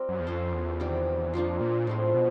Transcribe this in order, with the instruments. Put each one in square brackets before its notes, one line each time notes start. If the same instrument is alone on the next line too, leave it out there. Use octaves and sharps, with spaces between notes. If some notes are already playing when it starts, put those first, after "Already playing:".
Already playing: [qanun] G3 C4 A#4
[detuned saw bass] F#2
E2
[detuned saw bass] F2 [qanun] C#4 F4 A4 C5
[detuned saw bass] E2
[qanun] C3 D#3 G3
[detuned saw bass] F2 [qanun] F3 A#3 D4 F4
[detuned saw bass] A#2
[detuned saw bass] A2 [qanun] F3 G#3 C4
[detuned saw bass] B2